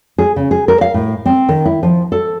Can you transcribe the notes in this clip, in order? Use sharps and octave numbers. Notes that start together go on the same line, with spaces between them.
G#4
C#3
G#4
A#4
F5
A2
C4
D#3
E4
F3
A4